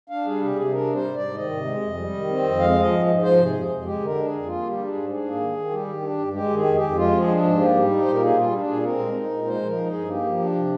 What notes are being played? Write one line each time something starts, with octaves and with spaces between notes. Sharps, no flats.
D4 F5
G3 G#4
C3 G4
C3 G#4
D4 A#4
G3
C5
G#2
D5
G#2
D#3 D#5
C3
G#3
F2
G3
D#3
C4
F2
G#3 F5
F3
D#5
G#2
G#2
F3 C5
C3
G#4
F2
F2
G#3 G4
D3 A#4
D4
F2 G#4
A#3 F4
G3 G4
D4
G#4
G#2
D4 G#4
A#3
D#3
D#3
G3 G4
D#3
D4
G2
G#3 G4
D#3 G#4
F2
G4
F2
G#3 F4
F3
G#4
D4
G#2
A#3 G4
G3
D#4
A#2 C5
A#4
A#3 G#4
G3 F4
D4
A#2 G#4
C4 A#4
G#3
D#4
A#2
G#3 C5
F3 A#4
D#4
G#4
G2
A#3 G4
F3
D4
C3